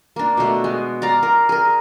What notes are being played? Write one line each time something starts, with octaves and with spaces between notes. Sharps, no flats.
A#3 D4
B2 A3
G#3
D5 F5 A#5
A#4
G#4 A#4